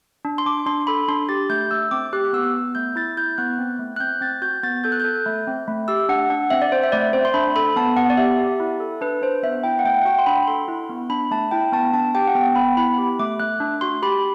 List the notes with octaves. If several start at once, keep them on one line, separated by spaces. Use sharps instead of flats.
D4
C6
D4 D6
D4 C6
A4 B5
D4 C6
G4 A6
A3 G6
A3 E6
C4 D6
G4 F#6
B3 E6
B3
A3 G6
E4 A6
E4 G6
B3 F#6
C4
A3
F#6
C4 G6
C4 A6
F#4 G6
B3 A6
A4 G6
F#6
A4 G6
A3
C4
A3
G4 E6
D4 F#5
D4 F#5
C4 E5
D5
C4 C5
E5
A3 D5
C4 C5
C6
D4 B5
A4 B5
B3 A5
B3 F#5
D5
G4 E5
G4
E4
A4
D4 B4
D4 C5
B3 E5
E4 G5
F#5
A3 G5
F#5
F#4 G5
C6
D4 B5
A4 C6
E4
B3
D4 B5
A3 A5
E4 G5
B3 A5
D4 A5
G4 G5
F#5
B3 G5
B3 B5
E4 B5
G4
A3 D6
A3 F#6
D4
F#4 C6
G4 B5